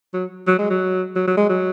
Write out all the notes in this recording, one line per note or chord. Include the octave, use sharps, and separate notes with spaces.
F#3
F#3
G#3
F#3
F#3
F#3
G#3
F#3